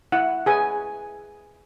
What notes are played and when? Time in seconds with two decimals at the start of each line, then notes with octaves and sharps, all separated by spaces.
0.12 E4 F#5
0.46 G#4 B4 G#5